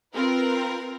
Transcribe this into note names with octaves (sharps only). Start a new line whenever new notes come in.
C4 F4 A#4 B4